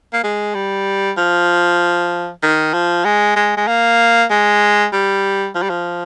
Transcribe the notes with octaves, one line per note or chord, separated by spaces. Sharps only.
A#3
G#3
G3
F3
D#3
F3
G#3
G#3
G#3
A#3
G#3
G3
F3
G3
F3